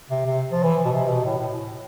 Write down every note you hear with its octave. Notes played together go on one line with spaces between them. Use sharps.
C3
C3
F3
E3
B2
C3
B2
A2
A2